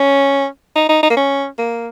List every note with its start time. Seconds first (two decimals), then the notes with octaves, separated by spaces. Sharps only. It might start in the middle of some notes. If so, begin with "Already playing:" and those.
Already playing: C#4
0.76 D#4
0.89 D#4
1.03 D#4
1.10 A#3
1.17 C#4
1.59 A#3